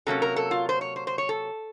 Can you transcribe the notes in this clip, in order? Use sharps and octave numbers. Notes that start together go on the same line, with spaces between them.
C3 F#3 A#3 C#4 A4
A#4
A4
F4
C5
C#5
C5
C5
C#5
A4